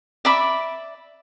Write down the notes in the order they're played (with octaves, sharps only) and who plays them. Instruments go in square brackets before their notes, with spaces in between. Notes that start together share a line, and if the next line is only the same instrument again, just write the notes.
[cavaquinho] D5 E5 B5 D6